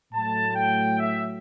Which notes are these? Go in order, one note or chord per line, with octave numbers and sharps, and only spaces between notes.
A2 F#3 A3 A5
G5
E5